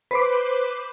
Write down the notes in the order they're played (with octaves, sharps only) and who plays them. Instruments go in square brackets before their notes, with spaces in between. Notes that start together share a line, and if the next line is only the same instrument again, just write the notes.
[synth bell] B4 C5 D6